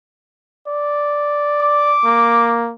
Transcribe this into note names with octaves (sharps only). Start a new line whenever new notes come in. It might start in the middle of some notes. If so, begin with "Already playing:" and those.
D5
D6
A#3